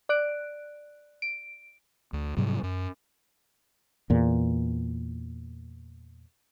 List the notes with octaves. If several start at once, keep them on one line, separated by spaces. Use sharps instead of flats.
D5 F#6 D7
D7
D2
G#2 C3 F#3 G3
F#2
E2 A#2